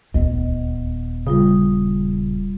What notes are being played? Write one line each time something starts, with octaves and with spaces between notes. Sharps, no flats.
D#1 D2 B3 D#5
C#3 G3 F4 D#6